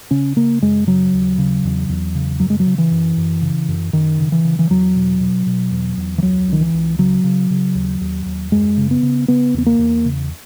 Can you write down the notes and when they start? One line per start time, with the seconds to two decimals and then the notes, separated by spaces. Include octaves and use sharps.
0.11 C#3 C#4
0.36 C#3 A#3
0.62 F#2 G#3
0.87 C#3 F#3
1.14 D#2
1.38 C#3
1.64 E2
1.89 E2
2.15 C#3
2.40 F#2 F#3
2.50 G#3
2.60 F#3
2.66 C#3
2.78 E3
2.91 F#2
3.17 F#2
3.42 C#3
3.68 F#2
3.93 F#2 D#3
4.18 C#3
4.32 E3
4.45 C#3
4.59 E3
4.70 E2 F#3
4.95 B2
5.20 B2
5.46 B2
5.71 E2
5.97 E2
6.18 E3
6.22 C#2 F#3
6.47 C#2 D#3
6.61 E3
6.74 C#2
6.99 C#3 F#3
7.24 C#3
7.50 C#3
7.75 D#2
8.01 D#2
8.26 D#2
8.52 F#2 G#3
8.77 C#3
8.91 B3
9.03 C#3
9.28 C#3 B3
9.54 E2 B3
9.66 A#3
9.79 E2
10.05 C#3